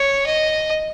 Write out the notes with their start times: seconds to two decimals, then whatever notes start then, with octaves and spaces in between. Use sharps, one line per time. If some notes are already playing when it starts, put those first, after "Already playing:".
Already playing: C#5
0.26 D#5